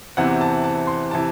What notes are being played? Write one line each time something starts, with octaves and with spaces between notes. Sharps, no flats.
E2 C3 E3 C4 F#5
A5
A5
C6
C3 E3 A5